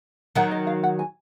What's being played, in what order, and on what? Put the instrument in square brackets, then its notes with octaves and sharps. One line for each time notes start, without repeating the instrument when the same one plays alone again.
[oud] D#3 F#3 [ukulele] F#5
[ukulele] D#5
F5
F#5
G#5